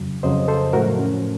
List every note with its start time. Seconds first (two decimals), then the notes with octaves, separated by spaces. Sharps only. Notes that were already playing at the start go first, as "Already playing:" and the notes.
Already playing: F2 C#3 F#3
0.23 F2 C#3 F#3 C5 D#5
0.48 A4 C5
0.73 A2 F3 A3 F#4 A#4
0.99 C#4